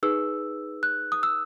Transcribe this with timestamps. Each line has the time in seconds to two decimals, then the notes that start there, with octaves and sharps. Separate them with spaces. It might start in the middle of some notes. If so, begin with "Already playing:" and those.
0.03 D#4 G#4 B4 E6
0.83 F#6
1.12 D#6
1.23 E6